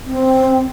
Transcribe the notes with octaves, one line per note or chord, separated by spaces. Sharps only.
C4